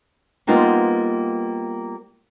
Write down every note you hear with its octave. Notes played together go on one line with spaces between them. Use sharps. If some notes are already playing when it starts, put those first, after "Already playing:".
G3 A#3 B3 D#4 F4 C5